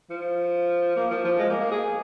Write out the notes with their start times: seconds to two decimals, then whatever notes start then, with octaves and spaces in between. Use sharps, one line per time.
0.10 F3
0.96 A#3
1.11 F3
1.24 F3
1.39 G#3
1.50 A#3
1.61 A#3
1.72 G#4